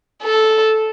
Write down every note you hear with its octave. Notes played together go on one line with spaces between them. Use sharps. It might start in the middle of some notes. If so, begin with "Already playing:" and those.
A4